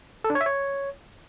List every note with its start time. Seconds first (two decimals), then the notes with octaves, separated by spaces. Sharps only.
0.24 A4
0.30 D4
0.35 C#5
0.41 E5
0.46 C#5